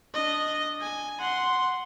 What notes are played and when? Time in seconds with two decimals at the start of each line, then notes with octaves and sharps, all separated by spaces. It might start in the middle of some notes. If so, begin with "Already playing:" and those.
0.14 D4 D#5
0.81 G#5
1.20 F#5 C6